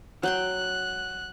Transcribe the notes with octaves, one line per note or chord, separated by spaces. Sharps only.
F#3 G5 C6 F#6